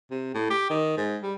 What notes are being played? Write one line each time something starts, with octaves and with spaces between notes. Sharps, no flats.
C3
A2
G4
D#3
G#2
G3